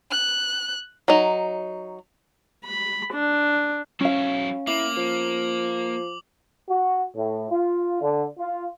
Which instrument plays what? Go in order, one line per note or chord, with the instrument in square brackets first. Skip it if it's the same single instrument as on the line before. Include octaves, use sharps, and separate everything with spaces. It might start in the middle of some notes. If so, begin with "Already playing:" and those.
[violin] F#6
[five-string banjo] F#3 D#4
[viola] B5
D4
[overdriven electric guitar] F#3 E4 [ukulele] C#4 F5
[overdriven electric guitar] A#3 [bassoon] E4 [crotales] D6 F#7
[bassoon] F3
[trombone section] F#4
A2
F4
D3
F4